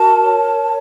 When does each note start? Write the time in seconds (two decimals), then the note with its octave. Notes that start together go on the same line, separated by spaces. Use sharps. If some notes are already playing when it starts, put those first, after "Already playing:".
Already playing: F#4 A#4 A5
0.23 C#5